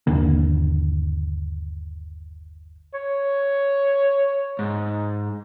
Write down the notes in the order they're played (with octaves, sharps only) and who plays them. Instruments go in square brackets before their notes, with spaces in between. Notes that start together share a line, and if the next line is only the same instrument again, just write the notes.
[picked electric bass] G1 D#2 D3 A#3
[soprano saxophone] C#5
[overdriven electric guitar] G#2